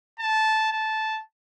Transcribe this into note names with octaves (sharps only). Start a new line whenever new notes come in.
A5
A5